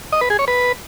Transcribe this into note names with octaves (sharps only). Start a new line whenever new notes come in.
D#5
B4
G#4
C#5
B4